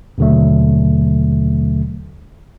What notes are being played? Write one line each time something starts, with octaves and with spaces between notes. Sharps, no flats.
D#2 B2 D3 F#3 A3